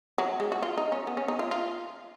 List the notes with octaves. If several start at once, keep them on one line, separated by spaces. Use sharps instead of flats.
F#3
G#3
F#4
F4
D#4
C#4
B3
C#4
D#4
F4
F4